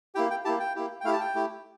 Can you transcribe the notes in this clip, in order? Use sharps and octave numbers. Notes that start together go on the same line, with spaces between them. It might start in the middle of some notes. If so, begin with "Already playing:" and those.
A#3 E4 G4 G5
G5
A#3 E4 G4 A5
G5
A#3 E4 G4
G5
A3 E4 G4 F5
A5
G5
A3 E4 G4